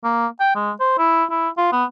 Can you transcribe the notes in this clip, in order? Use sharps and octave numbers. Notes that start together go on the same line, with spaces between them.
A#3
G5
G#3
C5
E4
E4
F4
B3